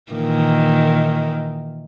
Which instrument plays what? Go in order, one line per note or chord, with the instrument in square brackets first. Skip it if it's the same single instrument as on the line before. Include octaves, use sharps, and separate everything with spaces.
[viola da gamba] A#2 D#3 E3